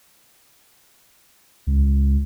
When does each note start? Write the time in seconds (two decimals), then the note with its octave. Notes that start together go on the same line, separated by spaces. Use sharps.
1.67 C#2